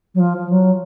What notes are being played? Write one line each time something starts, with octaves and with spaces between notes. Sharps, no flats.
F#3
F3
F3
F#3